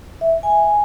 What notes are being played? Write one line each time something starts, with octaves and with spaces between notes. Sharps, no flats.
E5
G#5